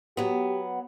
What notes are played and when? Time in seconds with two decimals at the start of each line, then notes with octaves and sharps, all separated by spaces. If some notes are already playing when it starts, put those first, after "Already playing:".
0.17 F#3 B3 G4